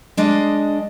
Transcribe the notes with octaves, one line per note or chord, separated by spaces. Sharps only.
G#3 D4 D#5